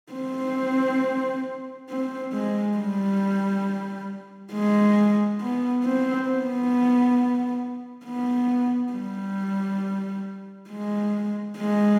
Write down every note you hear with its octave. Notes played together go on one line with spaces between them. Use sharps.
C4
C4
G#3
G3
G#3
B3
C4
B3
B3
G3
G#3
G#3